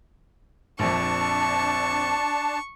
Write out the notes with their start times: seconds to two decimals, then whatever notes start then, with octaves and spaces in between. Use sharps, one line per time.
0.79 A#1 F2 D4 A5 C#6